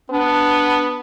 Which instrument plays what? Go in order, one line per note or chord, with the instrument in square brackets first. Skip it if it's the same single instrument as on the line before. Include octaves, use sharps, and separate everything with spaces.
[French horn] B3 [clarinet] D4